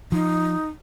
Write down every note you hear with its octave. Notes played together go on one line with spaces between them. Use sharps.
F3 D#4